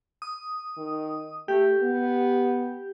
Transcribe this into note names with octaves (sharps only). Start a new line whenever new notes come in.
D#6
D#3
A3 G4
B3